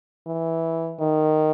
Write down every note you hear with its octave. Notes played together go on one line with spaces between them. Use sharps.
E3
D#3